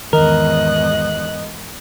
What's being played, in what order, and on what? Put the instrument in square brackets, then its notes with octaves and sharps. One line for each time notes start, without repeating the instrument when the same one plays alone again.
[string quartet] E2 G#2 F#6 [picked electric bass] D#3 [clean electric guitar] A#4 [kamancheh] D#5